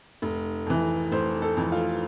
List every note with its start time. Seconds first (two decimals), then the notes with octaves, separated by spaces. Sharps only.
0.22 F1
0.66 F2 E3
1.12 F1 C5
1.42 A4
1.57 F2 E3
1.72 F4